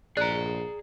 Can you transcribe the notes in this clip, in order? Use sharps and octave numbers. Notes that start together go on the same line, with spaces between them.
A#1 G#4 D5 A#5 F#6